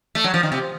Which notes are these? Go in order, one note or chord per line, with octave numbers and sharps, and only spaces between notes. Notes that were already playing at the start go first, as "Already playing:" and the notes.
A3
F#3
F3
D#3
C3